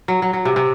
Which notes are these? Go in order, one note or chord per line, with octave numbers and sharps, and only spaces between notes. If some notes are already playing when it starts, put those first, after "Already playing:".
F#3
F#3
F#3
C3
C3